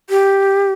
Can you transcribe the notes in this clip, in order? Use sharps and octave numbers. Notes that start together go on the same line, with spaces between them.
G4